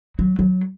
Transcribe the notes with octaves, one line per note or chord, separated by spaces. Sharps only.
F#3
F#3